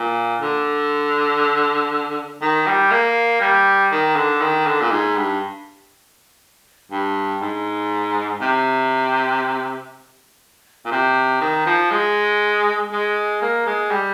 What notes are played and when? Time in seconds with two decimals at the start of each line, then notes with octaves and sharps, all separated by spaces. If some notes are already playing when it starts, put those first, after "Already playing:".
Already playing: A#2
0.42 D3
2.42 D#3
2.67 G3
2.91 A#3
3.41 G3
3.92 D#3
4.16 D3
4.42 D#3
4.67 D3
4.81 A#2
4.91 G#2
5.17 G2
6.91 G2
7.42 G#2
8.41 C3
10.85 A#2
10.91 C3
11.41 D#3
11.66 F3
11.92 G#3
12.92 G#3
13.42 A#3
13.66 G#3
13.91 G3